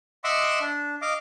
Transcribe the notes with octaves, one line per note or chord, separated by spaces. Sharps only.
D#5 E5 F#5 C6 D6 E6
D4
D#5 F5 D6